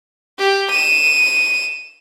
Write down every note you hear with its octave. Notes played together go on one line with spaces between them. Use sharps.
G4
D#7 E7